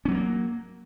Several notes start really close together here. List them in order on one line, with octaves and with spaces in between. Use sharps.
C#4 F#3 C4 A#3